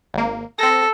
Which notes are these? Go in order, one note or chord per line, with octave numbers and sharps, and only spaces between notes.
G#1 A#3
C4 A4 A#6